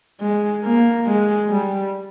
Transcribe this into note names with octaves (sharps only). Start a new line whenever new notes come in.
G#3
A#3
G#3
G3